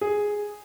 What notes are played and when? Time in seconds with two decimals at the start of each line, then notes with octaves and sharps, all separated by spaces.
0.01 G#4